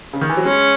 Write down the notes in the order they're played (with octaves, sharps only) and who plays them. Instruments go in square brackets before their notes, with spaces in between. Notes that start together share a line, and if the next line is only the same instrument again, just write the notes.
[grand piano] C#3
D#3
E3
F#3
[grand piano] G#3 [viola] C#4